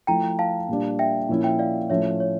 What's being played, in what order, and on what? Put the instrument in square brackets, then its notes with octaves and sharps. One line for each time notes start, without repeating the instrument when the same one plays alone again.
[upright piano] F3 A3 E4 [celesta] G5 A#5
[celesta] F5 A5
[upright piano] A#2 G3 D4
[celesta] E5 G5
[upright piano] A#2 F3 C#4 E4
[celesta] E5 G5
D5 F5
[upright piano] A2 F3 A3 C#4 [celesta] C#5 E5
[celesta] C#5